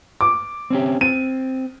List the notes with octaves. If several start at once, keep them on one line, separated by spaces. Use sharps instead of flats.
D6
C4 C#4 G4
C4 D#7